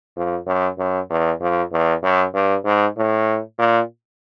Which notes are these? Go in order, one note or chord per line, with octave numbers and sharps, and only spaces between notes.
F2
F#2
F#2
E2
F2
E2
F#2
G2
G#2
A2
A#2